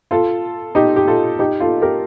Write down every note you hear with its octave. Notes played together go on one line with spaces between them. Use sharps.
F4 A4
D#4 G4
G4
F4 A4
D#4 G4
F4 A4
G4 A#4